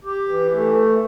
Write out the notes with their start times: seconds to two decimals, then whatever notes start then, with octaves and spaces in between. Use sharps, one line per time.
0.05 G4
0.29 E3
0.52 A3